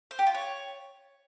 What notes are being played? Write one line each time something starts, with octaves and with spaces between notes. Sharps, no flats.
C5
G4
F4
C#5